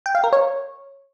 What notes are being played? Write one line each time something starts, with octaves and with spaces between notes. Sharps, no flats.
G5
F5
A#4
C#5